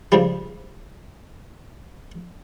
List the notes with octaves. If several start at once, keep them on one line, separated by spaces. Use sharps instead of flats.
C#2 G2 C#3 F3 G3